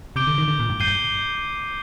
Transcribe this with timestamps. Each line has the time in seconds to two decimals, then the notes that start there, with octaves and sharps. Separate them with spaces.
0.16 C3 D6 G6 D7 G7
0.27 D3
0.38 D#3
0.48 D3
0.60 A#2
0.70 G2
0.80 G2 G6 C7 D#7 G7